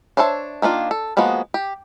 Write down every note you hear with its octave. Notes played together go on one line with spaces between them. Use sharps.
D4 C5 C#5 E5 A5
D#3 A#3 D4 F4
A4
F3 G#3 A#3 B3 F#4
G4